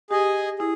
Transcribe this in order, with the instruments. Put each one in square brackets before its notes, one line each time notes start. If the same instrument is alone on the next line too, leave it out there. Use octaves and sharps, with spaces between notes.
[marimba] G4 [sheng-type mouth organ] G#4 D#5 G#5
[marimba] E4 [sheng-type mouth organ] G#4